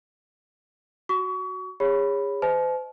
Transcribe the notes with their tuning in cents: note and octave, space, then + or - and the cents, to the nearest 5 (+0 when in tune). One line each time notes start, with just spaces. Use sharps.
F#4 +0 C#6 +35
G#4 -40 C#5 +0 B5 +0
C5 -40 D#5 +5 A5 -40